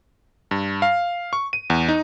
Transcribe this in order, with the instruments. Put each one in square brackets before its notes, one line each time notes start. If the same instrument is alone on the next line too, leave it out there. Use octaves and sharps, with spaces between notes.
[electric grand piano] G2
F5
C#6
D#7
E2
D#4